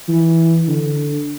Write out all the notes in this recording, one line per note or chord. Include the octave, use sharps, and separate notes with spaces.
E3
D3